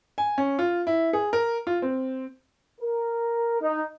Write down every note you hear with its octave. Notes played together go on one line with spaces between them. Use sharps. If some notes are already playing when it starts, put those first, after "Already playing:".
G#5
C#4
F4
E4
G#4
A#4
F4
C4
A#4
D#4